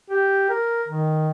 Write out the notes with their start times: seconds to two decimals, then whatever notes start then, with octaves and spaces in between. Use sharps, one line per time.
0.10 G4
0.49 A#4
0.88 D#3